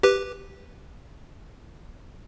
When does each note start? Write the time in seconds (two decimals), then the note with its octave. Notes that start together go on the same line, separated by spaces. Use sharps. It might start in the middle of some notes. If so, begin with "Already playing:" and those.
0.03 G4 B4